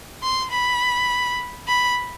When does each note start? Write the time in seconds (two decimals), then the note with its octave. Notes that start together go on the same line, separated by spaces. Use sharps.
0.22 C6
0.51 B5
1.68 B5